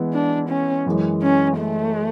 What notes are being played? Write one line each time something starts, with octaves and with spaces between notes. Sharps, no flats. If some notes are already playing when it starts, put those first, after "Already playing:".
Already playing: E3 G#3 B3 E4
D4
C#4
F#2 E3 G#3
C#4
A3